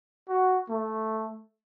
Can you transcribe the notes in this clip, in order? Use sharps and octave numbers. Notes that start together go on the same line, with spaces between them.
F#4
A3